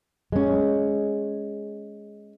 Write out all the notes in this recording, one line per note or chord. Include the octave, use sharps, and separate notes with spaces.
G#3 C#4